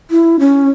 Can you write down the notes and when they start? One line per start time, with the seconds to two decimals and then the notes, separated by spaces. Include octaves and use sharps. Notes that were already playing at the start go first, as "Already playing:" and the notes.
0.11 E4
0.39 C#4